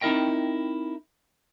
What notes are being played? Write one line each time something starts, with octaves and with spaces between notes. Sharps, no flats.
C4 D#4 E4 A#4 D#5 G5